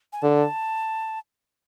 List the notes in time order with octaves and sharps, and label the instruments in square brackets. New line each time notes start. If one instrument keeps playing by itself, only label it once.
[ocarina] G#5
[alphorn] D3 [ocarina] A5